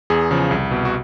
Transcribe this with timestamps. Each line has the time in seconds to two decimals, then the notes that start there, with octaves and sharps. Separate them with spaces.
0.10 E2 G#4
0.31 C#3 F3
0.51 C2
0.71 B2
0.85 F#4